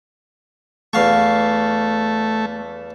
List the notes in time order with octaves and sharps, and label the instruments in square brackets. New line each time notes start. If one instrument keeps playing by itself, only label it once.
[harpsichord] E2 F5 C#6 [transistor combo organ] A3